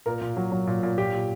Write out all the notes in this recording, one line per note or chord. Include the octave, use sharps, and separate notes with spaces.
A#2 A#4
A#2
F#3
F#3
A#2
A#2
A#2 G4
A#2